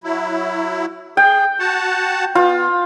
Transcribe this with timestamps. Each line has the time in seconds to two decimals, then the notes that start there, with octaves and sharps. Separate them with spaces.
0.04 F#3 E4
1.17 G#4 G5
1.59 F#4 F#5 A5
2.35 B3 F4